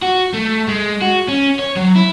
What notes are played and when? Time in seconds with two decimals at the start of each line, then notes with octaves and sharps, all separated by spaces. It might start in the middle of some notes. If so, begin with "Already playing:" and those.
0.02 F#4
0.34 A3
0.68 G#3
1.02 F#4
1.28 C#4
1.59 C#5
1.76 F#3
1.95 E4